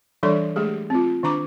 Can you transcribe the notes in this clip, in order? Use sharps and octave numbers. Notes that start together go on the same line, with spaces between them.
E3 G3 D4 A4 D5 C6
G#3 A3 G4 G#4
C4 F4
D#3 D4 A#5 D6